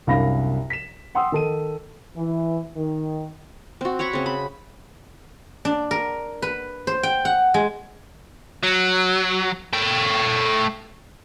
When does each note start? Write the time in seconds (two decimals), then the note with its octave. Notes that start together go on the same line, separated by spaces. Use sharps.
0.07 C2 F#2 D4 F5 B5 A#6
0.70 B6 E7
1.15 F#5 G5 C6 D#6 E6
1.32 D#3 A4 D#7
2.17 E3
2.76 D#3
3.81 C4 F#4
3.99 C#5 F#5 B5 C#6
4.13 C#3 C4
4.26 B5
5.65 D4
5.91 A#4
6.42 B4
6.87 C5
7.03 G5
7.25 F#5
7.54 G#3
8.63 F#3
9.73 A3 G5